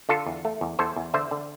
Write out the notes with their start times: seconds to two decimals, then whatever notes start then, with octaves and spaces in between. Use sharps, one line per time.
0.09 D3 F4 A4
0.26 E2
0.45 A3
0.61 E2
0.79 E2 A4 C5
0.96 E2
1.14 D3 C5 E5
1.31 D3